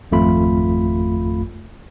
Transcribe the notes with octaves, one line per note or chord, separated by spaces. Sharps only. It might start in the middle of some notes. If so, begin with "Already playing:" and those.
G#1 F2 A3 F4 B5